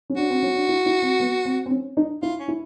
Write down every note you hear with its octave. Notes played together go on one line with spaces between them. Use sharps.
C#4
D4 F#4
C4
C#4
D4
E4
E4
C4
B3
C4
C4
C#4
D#4
E4 F4
C#4
E4